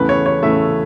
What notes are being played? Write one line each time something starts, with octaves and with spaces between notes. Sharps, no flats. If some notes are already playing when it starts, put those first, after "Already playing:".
Already playing: E2 C#3 A3 B4
C#5
C#5
E2 C#3 A3 E5